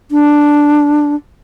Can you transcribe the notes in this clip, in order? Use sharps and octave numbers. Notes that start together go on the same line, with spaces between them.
D4